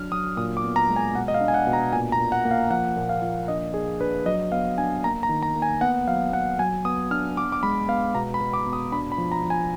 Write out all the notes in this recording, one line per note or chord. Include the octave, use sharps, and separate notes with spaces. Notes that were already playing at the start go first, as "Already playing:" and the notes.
Already playing: F#3 D4 F6
F#3 D#6
A#2 D#6
D6
B3
A#5
G#3
G#5
B2 F#5
D#5
F5
D4
G#5
F#5
B2
A#5
A#2 G#5
A#5
A#2
F#5
A#3
F5
F3 F#5
A#2
F5
F3
D4 D#5
D4 G#4
D4 B4
F#3 D#5
B3 F5
D4 G#5
A#3 A#5
A#5
D#3
A#5
A#3
G#5
B3 F#5
F#3 F5
B3 F#5
F#3 G#5
B3 D#6
D4 F6
B3 D6
D6
G#3 B5
B3 F5
B2 A#5
B5
B2
D6
B2
D#6
D4 B5
B5
F3
A#5
F3
G#5